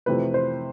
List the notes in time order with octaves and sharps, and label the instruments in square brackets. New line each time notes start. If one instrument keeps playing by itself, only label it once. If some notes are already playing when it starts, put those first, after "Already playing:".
[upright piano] F2 C3 E3 A3 C4 B4
C5